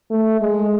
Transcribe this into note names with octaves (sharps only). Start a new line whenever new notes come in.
A3
G#3